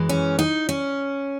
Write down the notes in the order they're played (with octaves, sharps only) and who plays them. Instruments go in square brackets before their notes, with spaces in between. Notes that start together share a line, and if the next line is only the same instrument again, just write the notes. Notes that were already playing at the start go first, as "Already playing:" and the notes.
Already playing: [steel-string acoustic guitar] F#2 E3 G#3
C#4
D#4
C#4